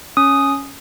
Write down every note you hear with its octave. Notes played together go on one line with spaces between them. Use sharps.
C#4 D#6